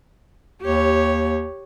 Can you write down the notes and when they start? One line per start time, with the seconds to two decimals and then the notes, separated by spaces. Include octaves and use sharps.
0.62 D#2 G4 C#5